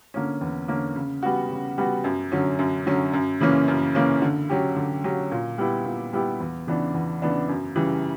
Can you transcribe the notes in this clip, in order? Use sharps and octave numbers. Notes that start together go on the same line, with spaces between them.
D3 A#3 C#4
E2
D3 A#3 C#4
C#3
G3 B3 F#4
C#3
G3 B3 F#4
F#2
D3 F#3 C#4
F#2
D3 F#3 C#4
F#2
C#3 E3 A#3 C#4
F#2
C#3 E3 A#3 C#4
D3
F#3 C#4 G4
D3
F#3 C#4 G4
A#2
G3 B3 E4 G4
A#2
G3 B3 E4 G4
E2
C#3 E3 B3 D4
E2
C#3 E3 B3 D4
F#2
C#3 E3 G3